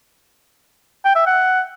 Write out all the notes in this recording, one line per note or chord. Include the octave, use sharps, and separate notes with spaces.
G5
E5
F#5